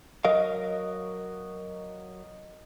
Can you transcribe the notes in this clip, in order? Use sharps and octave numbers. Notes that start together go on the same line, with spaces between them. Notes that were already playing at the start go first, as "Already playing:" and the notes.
F#3 A#4 D#5 F5